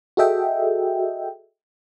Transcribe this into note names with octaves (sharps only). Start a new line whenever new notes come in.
F#4 G#4 A4 D#5 E5 G5